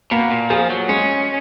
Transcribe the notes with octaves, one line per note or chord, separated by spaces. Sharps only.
B2 A#3
A#2
F3 G#4
F#3
G#3 C#4